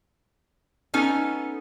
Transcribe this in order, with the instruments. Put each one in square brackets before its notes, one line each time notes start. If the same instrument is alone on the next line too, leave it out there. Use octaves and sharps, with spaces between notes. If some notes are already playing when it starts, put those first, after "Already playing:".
[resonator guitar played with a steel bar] B3 C#4 D#4 A4